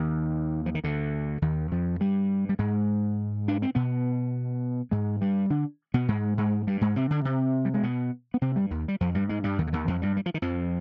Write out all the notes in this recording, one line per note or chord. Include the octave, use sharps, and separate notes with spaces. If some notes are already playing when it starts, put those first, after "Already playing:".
Already playing: D#2 D#3
F3
D#3
D2 D3
D#2 D#3
F2 F3
G2 G3
G3
G#2 G#3
D4
C4
B2 B3
G#2 G#3
G2 G3
D3 D4
B2 B3
G#2 G#3
G#2 G#3
G2 G3
G#2 G#3
C3 C4
D3 D4
C3 C4
G3
G#3
B2 B3
B3
C3 C4
G2 G3
D#2 D#3
G3
F2 F3
G2 G3
G#2 G#3
G2 G3
D#2 D#3
D3
D#2 D#3
F2 F3
G2 G3
G3
F3
D#3
F2 F3